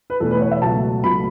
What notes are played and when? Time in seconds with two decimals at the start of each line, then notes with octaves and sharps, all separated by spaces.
0.10 B4
0.20 E2 B2 A3 A4
0.31 B4
0.41 C#5
0.51 E5
0.61 C#2 B2 F#3 A3 A5
1.04 C#2 B2 F#3 A3 B5